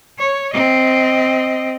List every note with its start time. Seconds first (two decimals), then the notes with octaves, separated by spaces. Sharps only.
0.19 C#5
0.53 C4 D#5